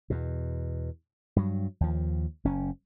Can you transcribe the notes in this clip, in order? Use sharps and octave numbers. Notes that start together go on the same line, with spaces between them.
E2 B2
G2 F#3
D#2 F3
F#1 C#4